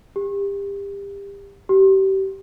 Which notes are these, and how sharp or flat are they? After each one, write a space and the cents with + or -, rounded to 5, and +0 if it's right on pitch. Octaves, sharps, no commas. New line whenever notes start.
G4 +30
G4 -30